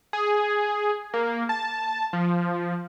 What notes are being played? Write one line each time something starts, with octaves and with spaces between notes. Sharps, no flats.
G#4
A#3
A5
F3